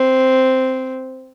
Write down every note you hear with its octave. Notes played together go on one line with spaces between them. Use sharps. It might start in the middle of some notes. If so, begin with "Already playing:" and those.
Already playing: C4